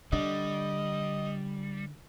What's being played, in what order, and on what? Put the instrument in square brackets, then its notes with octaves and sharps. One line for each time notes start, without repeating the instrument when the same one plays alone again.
[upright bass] D3 [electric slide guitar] G3 [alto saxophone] D#5